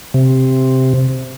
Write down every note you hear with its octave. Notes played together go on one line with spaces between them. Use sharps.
C3